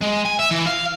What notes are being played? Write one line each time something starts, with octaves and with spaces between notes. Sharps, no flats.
G#3
G#5
E5
E3
F5